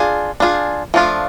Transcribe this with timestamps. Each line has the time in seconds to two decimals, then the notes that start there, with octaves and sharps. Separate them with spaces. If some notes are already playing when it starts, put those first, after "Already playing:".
Already playing: D4 F4 G#4
0.40 D4 F4 G#4
0.94 F3 A3 D4 F4